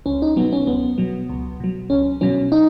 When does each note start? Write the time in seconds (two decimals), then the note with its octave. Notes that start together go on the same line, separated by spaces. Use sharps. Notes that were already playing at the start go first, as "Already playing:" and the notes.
0.06 C#2 C#4
0.22 D#4
0.36 B2 F#3 B3
0.53 C#4
0.67 C#2 B3
0.98 B2 F#3
1.30 C#2
1.60 B2 F#3
1.90 C#2 C#4
2.21 B2 F#3 C#4
2.52 D#4